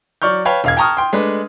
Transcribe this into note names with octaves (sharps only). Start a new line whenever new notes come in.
F#3 D5 C#6 F6 G6
B4 C#5 F5 G5 A5 B5
E1 F5 G#6
G5 A5 A#5 C#6 D#6 F6
G5 C6
G#3 A3 D4 B4